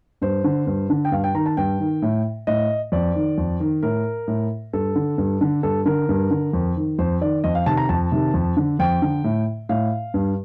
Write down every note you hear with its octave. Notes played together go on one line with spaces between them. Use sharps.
G2 C5
D3
G2
D3
G5
G2 F5
G5
D#3 A#5
A5
G2 G5
D#3
A2
A2 D#5
F2 D5
D#3
F2
D#3
A2 A#4
A2
G2 A4
D3
G2
D3
G2 A4
D3 A#4
G2
D3
F2
D#3
F2 C5
D#3 D5
F2 D#5
F5
C3 D#3 A5
A#5
F2 A5
C3 D#3
F2
D3
F2 G5
D3
A2
A2 F5
G2